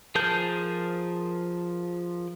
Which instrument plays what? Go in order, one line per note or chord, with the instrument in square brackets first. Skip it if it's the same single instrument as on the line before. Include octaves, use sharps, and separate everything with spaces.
[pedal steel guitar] F3 G#4 A#4 A5 G6